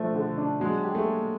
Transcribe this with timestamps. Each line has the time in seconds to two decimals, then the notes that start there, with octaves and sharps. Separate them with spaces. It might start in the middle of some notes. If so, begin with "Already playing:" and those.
Already playing: F3 A3 D4
0.15 D3
0.38 D4
0.60 F#3 G#3
0.84 G4
0.95 A3
1.06 A#3